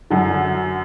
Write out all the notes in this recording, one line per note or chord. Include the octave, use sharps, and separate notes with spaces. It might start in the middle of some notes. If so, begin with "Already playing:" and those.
F#2 D3 F#3